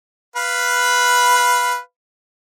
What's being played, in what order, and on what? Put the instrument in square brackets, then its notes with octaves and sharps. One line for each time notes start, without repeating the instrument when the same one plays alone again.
[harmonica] B4 F5 B5